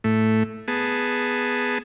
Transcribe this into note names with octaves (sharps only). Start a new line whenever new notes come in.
A2 A3
B3 G#4 A5